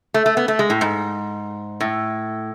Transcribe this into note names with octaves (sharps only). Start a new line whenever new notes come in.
A3
A3
B3
A3
G#3
A2
G#2
A2